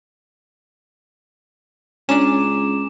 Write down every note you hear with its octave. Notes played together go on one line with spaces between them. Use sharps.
C#2 C#4 D4 G#5 A#5 D6 E7